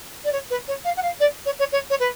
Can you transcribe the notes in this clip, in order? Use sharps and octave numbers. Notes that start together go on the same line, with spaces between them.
D5
C#5
B4
C#5
F5
F#5
F5
D5
C#5
C#5
C#5
C#5
B4